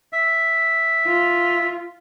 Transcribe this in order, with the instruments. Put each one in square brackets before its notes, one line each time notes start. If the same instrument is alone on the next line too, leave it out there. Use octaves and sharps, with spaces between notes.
[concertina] E5
[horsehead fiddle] F4